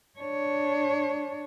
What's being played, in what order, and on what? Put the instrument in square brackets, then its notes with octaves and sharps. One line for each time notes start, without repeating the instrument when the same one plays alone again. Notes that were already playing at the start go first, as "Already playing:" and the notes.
[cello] D4 C#5